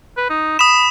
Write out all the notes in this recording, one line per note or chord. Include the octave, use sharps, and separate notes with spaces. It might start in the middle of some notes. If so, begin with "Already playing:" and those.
B4
D#4
B5 D#6 E7